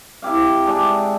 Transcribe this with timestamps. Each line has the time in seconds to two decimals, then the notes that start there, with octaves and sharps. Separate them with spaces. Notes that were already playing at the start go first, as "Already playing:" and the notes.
0.22 C3 E4 G4 F5
0.66 G#3 D4 G4 E5